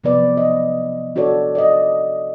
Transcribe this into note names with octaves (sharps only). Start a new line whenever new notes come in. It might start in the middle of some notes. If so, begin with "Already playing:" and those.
C3 F3 F#3 B3 B4 D5
D#5
D4 F#4 A4 C#5 D5
D5 D#5